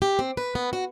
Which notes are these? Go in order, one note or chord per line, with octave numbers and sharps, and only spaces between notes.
G4
C4
B4
B3
F#4